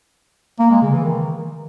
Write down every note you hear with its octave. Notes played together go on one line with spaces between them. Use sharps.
A#3
G#3
C#3
E3
D#3